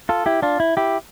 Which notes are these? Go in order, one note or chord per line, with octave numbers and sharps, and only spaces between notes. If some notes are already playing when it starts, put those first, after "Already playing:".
F4 A4
E4 G4
D4 F4
E4
E4 G4